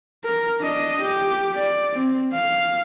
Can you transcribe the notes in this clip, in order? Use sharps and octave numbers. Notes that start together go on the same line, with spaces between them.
A#4
D4 D#5
G4
D5
C4
F5